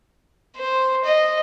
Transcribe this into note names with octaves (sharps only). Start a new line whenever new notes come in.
C5
D#5